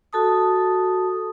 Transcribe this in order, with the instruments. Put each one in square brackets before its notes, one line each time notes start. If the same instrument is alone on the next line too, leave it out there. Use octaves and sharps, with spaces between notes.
[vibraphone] F#4 A4 A5 D#6